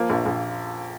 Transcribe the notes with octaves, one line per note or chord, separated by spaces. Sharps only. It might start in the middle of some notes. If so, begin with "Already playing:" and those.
Already playing: F3 A#3
A#1
A#1